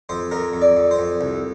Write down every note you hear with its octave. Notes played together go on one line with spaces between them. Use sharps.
F2 C5
F2 A#4
F2
D5
F2
C5
F2
C2